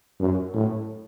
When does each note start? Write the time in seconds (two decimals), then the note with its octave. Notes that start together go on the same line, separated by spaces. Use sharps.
0.20 F#2
0.54 A2